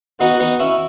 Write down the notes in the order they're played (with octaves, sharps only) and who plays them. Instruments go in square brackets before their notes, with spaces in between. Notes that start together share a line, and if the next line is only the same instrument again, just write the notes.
[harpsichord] B3 D#4 [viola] F#4
[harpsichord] B3 D#4
C#4 E4